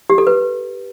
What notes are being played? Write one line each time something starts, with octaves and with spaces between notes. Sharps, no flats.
G4
A4
B4